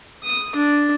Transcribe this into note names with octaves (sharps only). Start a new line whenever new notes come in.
D#6
D4